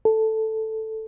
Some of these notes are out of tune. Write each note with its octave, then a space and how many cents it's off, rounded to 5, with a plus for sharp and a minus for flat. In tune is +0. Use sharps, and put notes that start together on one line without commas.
A4 +0